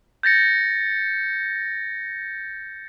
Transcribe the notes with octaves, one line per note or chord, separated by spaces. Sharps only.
G6 A6 A#6 C#7